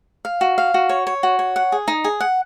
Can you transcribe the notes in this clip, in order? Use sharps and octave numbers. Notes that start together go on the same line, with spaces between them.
F5
F#4
F5
F#4
C#5
C#5
F#4
C#5
F#5
G#4
D#4
G#4
F#5